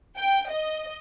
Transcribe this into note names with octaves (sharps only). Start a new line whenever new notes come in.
G5
D#5